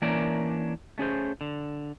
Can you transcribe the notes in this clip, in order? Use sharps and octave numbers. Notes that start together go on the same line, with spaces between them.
E3 A#3 C#4 D4 A#4 D5
A3 C#4 G#4 C5
D3